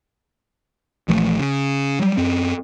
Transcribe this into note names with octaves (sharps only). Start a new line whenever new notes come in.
A#1 E3 F3 A3
C#3
F#3 G3
F#2 C4